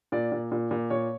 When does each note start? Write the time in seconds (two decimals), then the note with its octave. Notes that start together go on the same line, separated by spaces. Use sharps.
0.12 A#2 D5
0.32 A#2
0.51 A#2
0.71 A#2
0.90 A#2 C#5